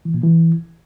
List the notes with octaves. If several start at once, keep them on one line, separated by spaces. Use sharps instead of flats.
E3
A#2
E3